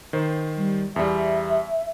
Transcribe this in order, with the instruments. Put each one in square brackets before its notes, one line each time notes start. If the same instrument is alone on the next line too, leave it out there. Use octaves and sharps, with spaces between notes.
[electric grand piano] D#3 C5
[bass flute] G3
[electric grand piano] E2 G3 [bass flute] E5